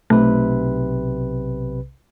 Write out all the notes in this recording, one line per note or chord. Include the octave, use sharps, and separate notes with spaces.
B1 C3 A3 B4